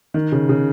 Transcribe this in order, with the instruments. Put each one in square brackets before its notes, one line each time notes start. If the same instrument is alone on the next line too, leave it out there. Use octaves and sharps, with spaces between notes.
[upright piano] D#3
C#3
C#3